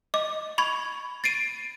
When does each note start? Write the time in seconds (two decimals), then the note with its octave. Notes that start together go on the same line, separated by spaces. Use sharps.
0.14 D#5 D6
0.58 B5 C#6 G#6
1.24 A6 C7 D7 D#7